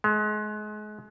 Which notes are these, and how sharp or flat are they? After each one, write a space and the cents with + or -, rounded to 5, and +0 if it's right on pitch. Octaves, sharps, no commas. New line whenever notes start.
G#3 +35